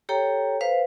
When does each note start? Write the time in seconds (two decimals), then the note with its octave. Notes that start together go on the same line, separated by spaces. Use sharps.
0.09 G4 A4 C#5 G5 A#5
0.61 B4 C5 F5